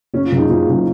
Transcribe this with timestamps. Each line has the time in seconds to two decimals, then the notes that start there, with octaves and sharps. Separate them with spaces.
0.14 F#1 C#4
0.25 F4
0.32 F#2 C#3
0.37 D#4
0.50 F#1 F4
0.67 F#2 C#3